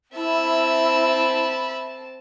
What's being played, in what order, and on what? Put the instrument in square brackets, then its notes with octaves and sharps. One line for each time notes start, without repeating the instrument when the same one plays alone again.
[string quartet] C4 A5 [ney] E4 [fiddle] E5 B5